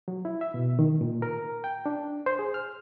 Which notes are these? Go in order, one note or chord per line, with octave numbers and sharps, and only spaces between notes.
F#3
E4
E5
B2
D#3
A#2
A#4
G5
D4
C5
G#4
F6